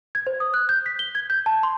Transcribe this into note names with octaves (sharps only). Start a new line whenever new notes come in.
G#6
C5
D#6
F#6
G6
B6
G7
G#6
G6
A5
C6